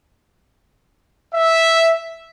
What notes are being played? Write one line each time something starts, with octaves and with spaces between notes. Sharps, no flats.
E5